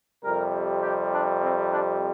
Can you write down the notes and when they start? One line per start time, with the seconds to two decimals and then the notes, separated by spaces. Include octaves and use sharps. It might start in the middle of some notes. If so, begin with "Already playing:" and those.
0.23 F2 C3 G3 A#4
0.82 G4
1.11 D4
1.41 C4
1.71 D4